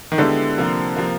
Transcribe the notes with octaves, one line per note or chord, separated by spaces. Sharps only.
D#3
D3 G#3 B3 E4 G4
C3 F3 A#3
C3 F3 A#3